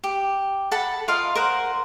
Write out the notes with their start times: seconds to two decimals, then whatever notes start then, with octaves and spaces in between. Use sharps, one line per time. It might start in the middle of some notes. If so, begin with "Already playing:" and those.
0.04 G4
0.71 A4 F#5 A5 B5
1.08 F4 A#4 D#5 F5
1.35 A#4 C5 F#5